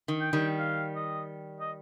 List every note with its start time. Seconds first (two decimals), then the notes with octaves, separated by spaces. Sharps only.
0.08 D#3
0.20 G5
0.33 D#3 G3
0.59 F5
0.96 D#5
1.60 D#5